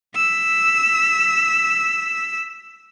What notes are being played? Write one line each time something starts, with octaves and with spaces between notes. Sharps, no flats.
E6 B6